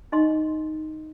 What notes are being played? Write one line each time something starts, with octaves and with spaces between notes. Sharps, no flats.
D#4 D#5 C6